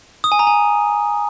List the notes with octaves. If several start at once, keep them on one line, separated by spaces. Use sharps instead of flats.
D#6
G#5
A#5
G#5